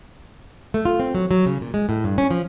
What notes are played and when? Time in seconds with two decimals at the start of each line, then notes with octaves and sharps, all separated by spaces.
0.74 A3
0.85 F4
1.00 C4
1.15 F#3
1.31 F#3
1.46 C#3
1.61 A#2
1.74 G#3
1.89 A2
2.04 G2
2.18 C#4
2.31 F3